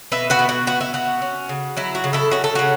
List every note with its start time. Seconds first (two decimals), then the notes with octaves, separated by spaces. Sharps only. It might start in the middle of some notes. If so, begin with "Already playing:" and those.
0.12 B2 B4 E5
0.30 F#4 B4
0.39 B2
0.49 F#4
0.67 B3 F#4
0.81 E4
0.94 B3 F#4
1.22 C#4
1.49 C#3
1.77 F#3 E4
1.95 F#4
2.04 C#3
2.13 E4 A4
2.31 C#4 F#4
2.44 A4
2.55 C#3 F#4